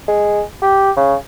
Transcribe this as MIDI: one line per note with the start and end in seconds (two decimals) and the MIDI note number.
0.08 0.42 56
0.62 0.91 67
0.97 1.14 49